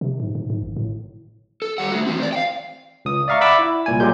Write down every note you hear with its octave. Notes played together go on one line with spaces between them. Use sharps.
C3
G#2
G#2
G#2
G#1
A2
A4
G3 F#5
A3 F#4
E3 C4
C5 D5
F5 G5
C#2 D#6
D5 E5 F5 A#5 C#6
D5 E5 F#5 B5 D6 E6
E4
C2 A#2 G#5
A#2 F#3 G#3 G4 G6